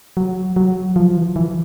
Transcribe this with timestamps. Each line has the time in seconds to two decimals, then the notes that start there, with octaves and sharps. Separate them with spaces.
0.17 F#3
0.56 F#3
0.96 F3
1.17 E3
1.36 E3